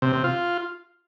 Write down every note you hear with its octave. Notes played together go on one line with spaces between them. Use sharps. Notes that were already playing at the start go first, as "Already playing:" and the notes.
C3
C3
F4